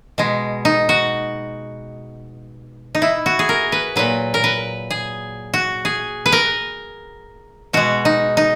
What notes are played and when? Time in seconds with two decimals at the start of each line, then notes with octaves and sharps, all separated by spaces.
0.18 B2 G#3
0.65 D#4
0.89 F#4
2.95 D#4
3.02 E4
3.26 F#4
3.39 G#4
3.49 A#4
3.72 B4
3.96 A#2 F#3 B4
4.34 A#4
4.44 B4
4.90 G#4
5.54 F#4
5.85 G#4
6.26 B4
6.32 A#4
7.73 B2 G#3 F#4
8.05 D#4
8.37 D#4